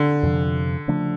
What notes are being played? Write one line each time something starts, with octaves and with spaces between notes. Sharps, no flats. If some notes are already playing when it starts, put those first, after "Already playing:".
Already playing: D3
F2 C3 F3
C#3 F3 A3 D4